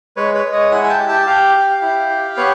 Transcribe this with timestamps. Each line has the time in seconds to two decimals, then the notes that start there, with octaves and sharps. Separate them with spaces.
0.16 G#3 B4 C#5
0.34 B4 C#5
0.44 G#3
0.53 C#5 D#5
0.71 E4 F#5 G#5
0.84 G#5
0.90 G5 A5
0.99 G4
1.09 G5 A5
1.27 G4 F5 G5
1.55 G4
1.82 E4
2.10 G4
2.37 B3 B4 C#5